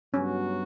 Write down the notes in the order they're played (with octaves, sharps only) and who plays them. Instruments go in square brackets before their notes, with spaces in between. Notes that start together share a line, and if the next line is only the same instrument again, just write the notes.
[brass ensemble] G2 F#3 B3 F#4 [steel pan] C#4